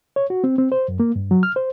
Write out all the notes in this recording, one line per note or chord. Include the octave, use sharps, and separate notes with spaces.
C#5
F#4
C4
C4
C5
F#2
A#3
G2
F#3
F6
C5